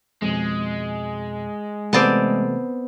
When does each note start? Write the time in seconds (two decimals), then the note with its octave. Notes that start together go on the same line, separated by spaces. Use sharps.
0.22 F2 B2 G#3
1.93 C3 E3 A3 B3 C4 D5 A5